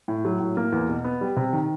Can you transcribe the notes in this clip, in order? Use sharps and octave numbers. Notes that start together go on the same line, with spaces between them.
A2
F#3
A2
A#3
E2
B2
B3
G3
C3
D#3